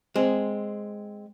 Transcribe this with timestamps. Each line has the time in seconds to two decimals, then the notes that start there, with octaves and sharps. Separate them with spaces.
0.16 G#3 C4